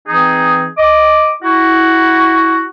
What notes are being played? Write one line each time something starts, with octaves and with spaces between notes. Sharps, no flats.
E3 C4 D#4 G#4
D#5 D6
E4 F#4